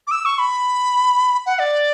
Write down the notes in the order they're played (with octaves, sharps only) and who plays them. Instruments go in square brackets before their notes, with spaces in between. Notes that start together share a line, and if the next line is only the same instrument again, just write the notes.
[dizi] D6
E6
C#6
B5
F#5
D5